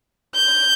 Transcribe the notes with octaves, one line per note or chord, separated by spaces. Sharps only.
G6